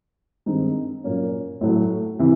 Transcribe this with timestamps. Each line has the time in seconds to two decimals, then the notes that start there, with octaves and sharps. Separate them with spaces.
0.46 G2 D#3 G#3 C4 D#4
1.04 A#2 F#3 A#3 C#4
1.61 A2 F#3 A3
2.19 C3 E3